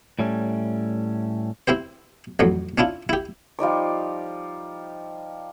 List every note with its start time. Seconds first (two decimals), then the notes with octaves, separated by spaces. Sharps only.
0.19 A2 G3 A3 C#4
1.68 C4 E4 G4 C5
2.39 A1 F2 F#3
2.78 C#4 D4 E4 F4
3.09 E4 G4
3.59 F3 G3 D#4 D6